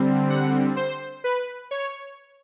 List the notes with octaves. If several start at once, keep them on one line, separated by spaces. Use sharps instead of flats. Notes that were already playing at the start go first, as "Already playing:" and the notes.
Already playing: D3 G3 C4
F#5
C5
B4
C#5